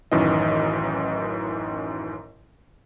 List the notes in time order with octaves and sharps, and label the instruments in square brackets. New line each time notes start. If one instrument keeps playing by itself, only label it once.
[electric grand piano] A1 F#2 D#3 E3 D#5